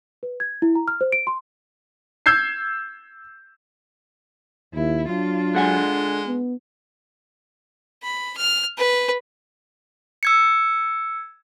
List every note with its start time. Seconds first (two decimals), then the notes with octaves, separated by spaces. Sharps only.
0.23 B4
0.40 G#6
0.62 E4
0.75 A#5
0.88 F6
1.01 C5
1.12 D7
1.27 C6
2.26 E6 G6 G#6 C7
4.74 D#2 E4
5.08 F#3 D4 F4
5.55 D3 G#3 F#5 G#5
6.27 B3
8.03 B5
8.37 F6
8.78 B4
10.23 E6 G#6 C#7